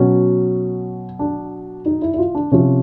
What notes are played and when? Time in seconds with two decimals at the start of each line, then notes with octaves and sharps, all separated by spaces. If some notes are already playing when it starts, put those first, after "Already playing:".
Already playing: B2 F#3 C#4
1.19 D4
1.86 D#4
2.02 E4
2.14 E4
2.18 F4
2.35 D4
2.51 C3 F3 C#4